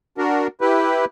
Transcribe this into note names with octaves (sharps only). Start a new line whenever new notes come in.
D4 F#4 A#4
E4 G4 B4